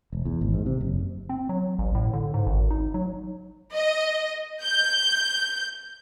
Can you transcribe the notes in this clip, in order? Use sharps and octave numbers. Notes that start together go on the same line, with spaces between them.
E1
E2
G#1
G#2
C3
F#1
C4
F#3
A1
A2
D3
G#2
G#1
D#4
F#3
D#5
G6